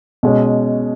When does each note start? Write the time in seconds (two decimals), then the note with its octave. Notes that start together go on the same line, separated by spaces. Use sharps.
0.23 B2 G#3 C#4